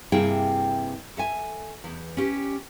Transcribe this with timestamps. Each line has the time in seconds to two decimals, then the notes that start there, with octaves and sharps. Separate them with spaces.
0.12 G2 C3 A#3 E4 G#4 G5
1.17 A4 E5 G#5
1.84 E2
2.17 C#4 G4